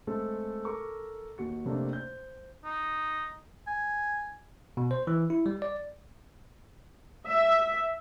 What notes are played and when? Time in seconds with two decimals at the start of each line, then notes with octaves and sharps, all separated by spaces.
0.07 G#3 A3 C4 A4
0.65 A4 A#4 A#5 C#6 D6
1.38 D#2 F#4 C#7
1.66 F2 C3 A3 A#3 C4 D4
1.93 C5 G6
2.65 D#4
3.67 G#5
4.77 B2
4.91 C5
5.07 E3
5.30 E4
5.46 G3
5.62 D5
7.27 E5